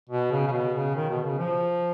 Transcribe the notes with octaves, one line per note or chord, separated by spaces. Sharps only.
B2
C#3
C#3
B2
C#3
D#3
B2
C#3
F3